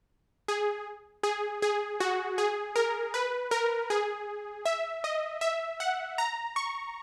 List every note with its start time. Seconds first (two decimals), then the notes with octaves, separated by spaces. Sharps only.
0.48 G#4
1.23 G#4
1.62 G#4
2.00 F#4
2.38 G#4
2.76 A#4
3.14 B4
3.51 A#4
3.90 G#4
4.65 E5
5.04 D#5
5.41 E5
5.80 F#5
6.18 A#5
6.56 C#6